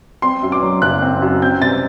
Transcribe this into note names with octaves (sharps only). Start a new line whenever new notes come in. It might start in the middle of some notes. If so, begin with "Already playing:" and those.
C4 C6
F#2
D6
F#3
F#1 F#6
C4
F#2
C4 G6
C3 A6